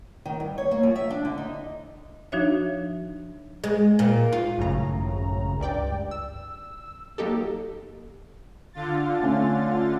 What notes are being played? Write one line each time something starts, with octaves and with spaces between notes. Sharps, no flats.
D#3
G2
C#5
A#3
F3
E5
D4
D3
D#4
F3 D4 D#4 F#4 C#5 E5
G#3
A#2
F4
G#1 F#2 A2 C#3 A#5
C#2 G2 D5 G5
E6
F#3 A#3 D#4 G4 A4
D3 F4 A6
A3 C#4